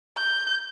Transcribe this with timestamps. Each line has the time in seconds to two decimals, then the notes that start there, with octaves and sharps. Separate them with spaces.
0.16 G6